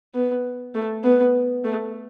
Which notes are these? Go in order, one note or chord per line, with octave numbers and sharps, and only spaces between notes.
B3
A3
B3
A3